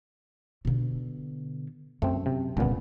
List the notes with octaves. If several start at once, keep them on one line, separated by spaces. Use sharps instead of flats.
B2 D3
F#2 A3 C4
C3
D#1 C#2 A#2 D3 B3